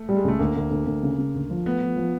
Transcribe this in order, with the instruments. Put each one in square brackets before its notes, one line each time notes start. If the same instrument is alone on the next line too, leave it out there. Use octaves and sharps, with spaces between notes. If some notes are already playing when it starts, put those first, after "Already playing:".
Already playing: [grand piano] A3
[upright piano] G3
[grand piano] G#3
[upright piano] C#2 [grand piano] A3
[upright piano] D2 [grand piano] A#3
[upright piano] D2
D2
D2
C#3
C#3
D2
F3
[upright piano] A3 [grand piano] B3
[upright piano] F3
F3